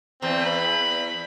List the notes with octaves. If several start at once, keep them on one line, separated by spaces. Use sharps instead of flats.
E2 C4
B5